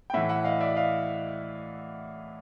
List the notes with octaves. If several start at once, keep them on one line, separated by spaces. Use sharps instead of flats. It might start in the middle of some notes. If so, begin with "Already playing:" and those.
G5
A2 E3 E5 F#5
E5 F#5
D#5 F5
D5 E5
D#5 F5